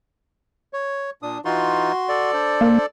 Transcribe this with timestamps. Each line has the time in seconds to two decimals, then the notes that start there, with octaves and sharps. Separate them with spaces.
0.73 C#5
1.22 A#2 D4 D#6
1.45 E3 D#4 F4 F#4 C6
2.09 A4 D5
2.34 D4 C5
2.61 A#3